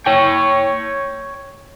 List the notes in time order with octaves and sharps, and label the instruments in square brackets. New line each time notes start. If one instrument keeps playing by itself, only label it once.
[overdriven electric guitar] C#5 G5